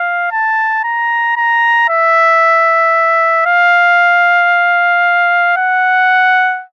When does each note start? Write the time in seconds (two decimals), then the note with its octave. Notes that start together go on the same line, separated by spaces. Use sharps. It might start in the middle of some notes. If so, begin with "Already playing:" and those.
Already playing: F5
0.32 A5
0.84 A#5
1.37 A#5
1.89 E5
3.46 F5
5.57 F#5